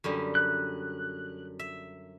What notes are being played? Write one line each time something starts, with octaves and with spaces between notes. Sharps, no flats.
F#2 D3 G3
F#6
E5